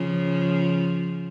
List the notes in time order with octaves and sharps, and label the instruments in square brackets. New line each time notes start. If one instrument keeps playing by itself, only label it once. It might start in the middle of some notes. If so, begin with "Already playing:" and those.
Already playing: [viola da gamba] C#3 F3